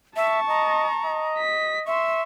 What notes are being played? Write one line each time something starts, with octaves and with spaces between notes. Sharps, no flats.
E5 A5 C#6
D#5 A#5
D#5
B6
E5 C6 C#6